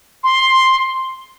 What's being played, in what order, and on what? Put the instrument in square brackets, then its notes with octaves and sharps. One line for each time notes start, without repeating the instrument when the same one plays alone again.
[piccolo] C6